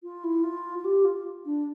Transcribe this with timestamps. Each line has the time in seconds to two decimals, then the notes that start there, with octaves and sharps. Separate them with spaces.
0.03 F4
0.24 E4
0.43 F4
0.79 F4
0.84 G4
1.04 F4
1.45 D4